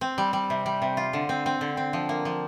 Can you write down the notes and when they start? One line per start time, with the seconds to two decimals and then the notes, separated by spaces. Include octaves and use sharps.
0.01 C4
0.18 G3
0.33 G3
0.50 C3
0.66 G3
0.82 C3
0.97 F4
1.13 D3
1.29 C4
1.46 C4
1.61 D3
1.77 C4
1.93 F3
2.09 A#3
2.25 F3